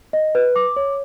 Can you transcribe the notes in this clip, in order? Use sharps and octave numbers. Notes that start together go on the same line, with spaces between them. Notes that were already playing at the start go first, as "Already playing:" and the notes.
D#5
B4
D6
C#5